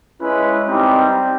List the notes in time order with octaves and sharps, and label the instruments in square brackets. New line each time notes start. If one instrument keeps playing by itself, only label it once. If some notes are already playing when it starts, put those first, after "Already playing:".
[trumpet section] G#3 C#4 E4 B4
G3 C4 D#4 G4